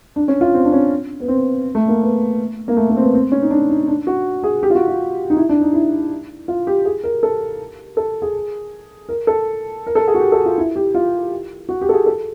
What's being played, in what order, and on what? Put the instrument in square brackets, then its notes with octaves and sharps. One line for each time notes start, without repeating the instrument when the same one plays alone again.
[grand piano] D4
C#4
F4
C4
D4
C#4
B3
C4
A3
A#3
B3
A#3
A3
A#3
C4
B3
C4
C#4
D#4
D4
D#4
D4
F#4
G#4
G4
F4
F#4
F4
D#4
E4
D4
D#4
E4
F4
G4
G#4
A#4
A4
A4
G#4
A#4
A4
A#4
A4
G#4
F#4
G4
A4
F4
E4
G4
F4
F#4
G4
A4
G#4
A4